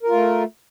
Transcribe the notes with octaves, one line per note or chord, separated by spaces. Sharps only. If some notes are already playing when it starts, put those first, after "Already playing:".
A3 F4 A#4